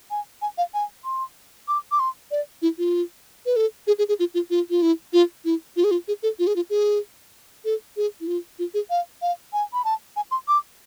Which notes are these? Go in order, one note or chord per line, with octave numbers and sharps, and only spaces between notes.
G#5
G#5
F5
G#5
C6
D6
D6
C6
D5
E4
F4
B4
A4
G#4
G#4
G#4
F4
F4
F4
F4
E4
F4
E4
F4
G#4
F4
G#4
A4
F4
G#4
F4
G#4
A4
G#4
E4
F4
F4
G#4
F5
F5
G#5
B5
A5
G#5
C6
D6